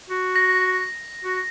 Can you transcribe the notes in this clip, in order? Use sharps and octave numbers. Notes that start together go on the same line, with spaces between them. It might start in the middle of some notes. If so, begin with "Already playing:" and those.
F#4
A#6
F#4